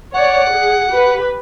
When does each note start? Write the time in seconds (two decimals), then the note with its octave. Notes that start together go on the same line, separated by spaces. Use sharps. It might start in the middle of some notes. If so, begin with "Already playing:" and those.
0.13 C#5 D5 F#5
0.52 G#4
0.89 G4 B4